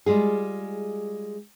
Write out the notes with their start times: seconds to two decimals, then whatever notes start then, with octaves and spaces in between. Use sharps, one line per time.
0.06 G3 G#3 F4 G#4